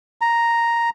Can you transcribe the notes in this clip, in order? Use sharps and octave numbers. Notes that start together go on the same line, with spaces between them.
A#5